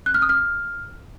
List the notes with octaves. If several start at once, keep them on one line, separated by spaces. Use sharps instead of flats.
F#6
F6
D#6
F6